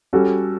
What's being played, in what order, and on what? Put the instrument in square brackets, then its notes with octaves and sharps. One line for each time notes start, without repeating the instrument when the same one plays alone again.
[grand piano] G3 C#4 F#4 A4